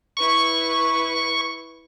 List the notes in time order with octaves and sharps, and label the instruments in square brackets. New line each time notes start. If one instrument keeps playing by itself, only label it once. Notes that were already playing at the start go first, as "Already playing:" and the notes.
[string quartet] E4 B4 [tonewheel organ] C#6